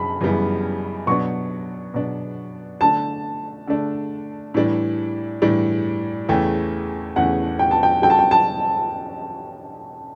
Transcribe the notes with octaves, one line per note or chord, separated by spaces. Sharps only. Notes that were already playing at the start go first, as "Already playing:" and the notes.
Already playing: F#2 C#3 B5
F#2 C#3 E3 G3 B3
B2 F#3 B3 D4 C#6
B2 F#3 B3 D4
D3 A3 D4 A5
D3 A3 D4
A2 E3 G3 D4
A2 E3 G3 D4
E2 C#3 E3 A3 C#4 G5
E2 C#3 E3 A3 C#4 F#5
G5
A5
G5
C#3 G3 C#4 F#4 A4 G5
A5
G5
A5